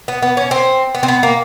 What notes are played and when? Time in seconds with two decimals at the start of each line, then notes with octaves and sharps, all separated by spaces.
0.08 B3
0.22 B3
0.37 C#4
0.51 C4
0.95 B3
1.03 C4
1.08 B3
1.23 A#3